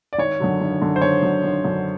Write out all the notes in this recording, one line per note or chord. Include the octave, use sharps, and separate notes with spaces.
D5
G#1 C#5
F#2 D3 F#3
G#1
F#2 D3 F#3
C5
G#1 C#5
F#2 D3 F#3
G#1
F#2 D3 F#3